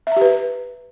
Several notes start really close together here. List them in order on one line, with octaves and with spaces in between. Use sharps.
E5 A#5 G4 B4